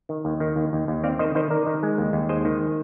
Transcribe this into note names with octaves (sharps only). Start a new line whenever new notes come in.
D#3
D#2
D#3
D#2
D#2
D#2
C4 D5 F5
D#3 C5 D#5
D#3 C5 D#5
D#3 A#4 D5
D#3
G#3
D#2
D#2
G#3 C5 D#5
D#3